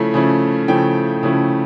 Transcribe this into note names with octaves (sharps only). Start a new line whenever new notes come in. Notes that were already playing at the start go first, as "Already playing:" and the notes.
Already playing: C#3 F3 A3 C#4 E4
C#3 F3 A3 C#4 E4
C#3 F3 A3 C#4 E4 G5
C#3 F3 A3 C#4 E4